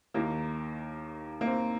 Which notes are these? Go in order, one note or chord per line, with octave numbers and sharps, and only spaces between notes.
D#2 D#3 A#3
A#3
C4